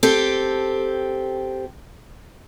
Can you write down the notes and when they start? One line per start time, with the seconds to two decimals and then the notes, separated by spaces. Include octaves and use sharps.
0.03 C4 G4 A4